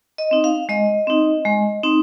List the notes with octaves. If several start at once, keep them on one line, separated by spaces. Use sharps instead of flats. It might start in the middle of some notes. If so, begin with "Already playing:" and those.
D#5
C4 D#4
F5
G#3 D#5
C4 D#4
G#3
C4 D#4